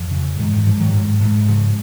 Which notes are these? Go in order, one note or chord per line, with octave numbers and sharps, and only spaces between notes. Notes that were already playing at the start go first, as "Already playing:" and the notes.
Already playing: F2
C#3
G#2 D#3
D#3
G#2 F3
D#3 F#3
G#2
G#2
C#3 F3